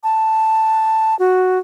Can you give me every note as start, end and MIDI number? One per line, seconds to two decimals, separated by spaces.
0.04 1.17 81
1.19 1.59 66